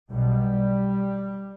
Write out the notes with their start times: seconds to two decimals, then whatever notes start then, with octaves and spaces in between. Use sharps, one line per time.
0.11 B1 B2 G3